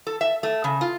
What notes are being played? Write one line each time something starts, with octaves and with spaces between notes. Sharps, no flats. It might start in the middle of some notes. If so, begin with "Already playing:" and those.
A4
E5
A3
C#3
F4